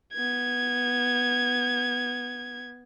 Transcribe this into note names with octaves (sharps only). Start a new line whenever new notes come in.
B3 G#6